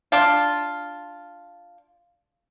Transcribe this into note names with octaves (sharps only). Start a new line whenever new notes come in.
D4 F4